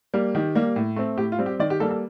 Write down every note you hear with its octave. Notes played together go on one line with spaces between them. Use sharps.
G3 A#3
D#3 G4
G3 A#3
A2
A3 C4
A2 G4
F4
G3 C4
G4
D#3 D5
G4
G3 A#3 A4
A4